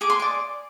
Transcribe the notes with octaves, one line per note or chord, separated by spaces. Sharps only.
G#4 D6
C6
D6
D5